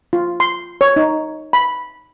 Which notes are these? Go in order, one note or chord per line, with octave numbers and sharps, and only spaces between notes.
F4
C6
C#5
D#4
B5